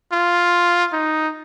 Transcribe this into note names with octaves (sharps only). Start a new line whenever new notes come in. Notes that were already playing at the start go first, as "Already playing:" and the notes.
F4
D#4